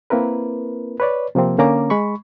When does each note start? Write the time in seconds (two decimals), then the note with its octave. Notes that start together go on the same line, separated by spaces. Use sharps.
0.10 A#3 C4 E4 A#4 B4
1.00 B4 C#5 D5
1.35 C3 F3 A#3 C4
1.58 D3 A#3 C#4 A#5 D6
1.90 G#3 B5 C#6